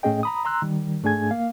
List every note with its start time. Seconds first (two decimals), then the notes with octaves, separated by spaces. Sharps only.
0.03 A2 A3 C#4 G#4 D#5 G5
0.23 A#5 B5 D#6
0.45 A#5 C6 E6 F#6
0.62 D#3 G3
1.03 G#2 A3 D4 G#4 G#5 G#6
1.31 A#3 F5